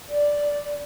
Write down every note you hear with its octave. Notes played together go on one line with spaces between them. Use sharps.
D5